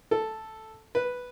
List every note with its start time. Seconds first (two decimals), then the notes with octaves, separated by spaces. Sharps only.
0.11 A4
0.95 B4